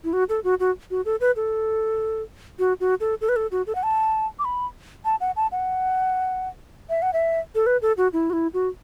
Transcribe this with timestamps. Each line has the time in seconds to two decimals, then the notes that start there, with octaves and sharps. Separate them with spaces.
0.04 E4
0.13 F#4
0.29 A4
0.44 F#4
0.60 F#4
0.91 F#4
1.05 A4
1.21 B4
1.36 A4
2.59 F#4
2.80 F#4
3.00 A4
3.21 A4
3.29 B4
3.36 A4
3.51 F#4
3.67 A4
3.75 F#5
3.83 A5
4.39 D6
4.45 B5
5.05 A5
5.21 F#5
5.36 A5
5.52 F#5
6.90 E5
7.02 F#5
7.13 E5
7.55 A4
7.66 B4
7.82 A4
7.97 F#4
8.13 E4
8.30 F#4
8.33 E4
8.54 F#4